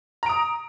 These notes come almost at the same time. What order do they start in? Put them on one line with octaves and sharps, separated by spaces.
A#5 D7 D#6